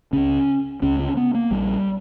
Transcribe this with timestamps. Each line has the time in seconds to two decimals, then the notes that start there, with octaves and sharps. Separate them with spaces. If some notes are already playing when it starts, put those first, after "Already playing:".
0.13 C#2 C#3 C#4
0.82 C#2 C#3 C#4
0.99 C#4
1.17 B3
1.35 A#3
1.51 A#1 A#2 G3